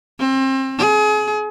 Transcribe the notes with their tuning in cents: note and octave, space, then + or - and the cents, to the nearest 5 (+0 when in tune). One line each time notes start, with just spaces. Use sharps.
C4 +30
G#4 +30